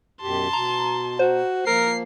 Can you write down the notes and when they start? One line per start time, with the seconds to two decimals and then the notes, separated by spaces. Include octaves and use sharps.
0.22 F#2 B2 G4 A5 C6
0.53 B2 A#5
1.19 F#4 C5
1.66 F3 A#3 A#4 C7